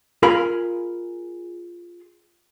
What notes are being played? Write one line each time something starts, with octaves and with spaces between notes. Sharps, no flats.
F4 G#4 A#4 G#5 B5